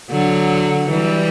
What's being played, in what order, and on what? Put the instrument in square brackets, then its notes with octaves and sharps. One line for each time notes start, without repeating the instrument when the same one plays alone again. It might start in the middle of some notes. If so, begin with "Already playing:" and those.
[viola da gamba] D3 F#3
E3 G3